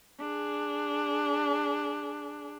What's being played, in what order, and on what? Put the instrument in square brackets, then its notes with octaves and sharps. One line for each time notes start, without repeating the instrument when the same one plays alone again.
[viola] D4 G#4